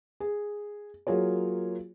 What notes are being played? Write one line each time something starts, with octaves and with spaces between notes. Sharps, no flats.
G#4
F#3 A#3 F4 G#4 C#5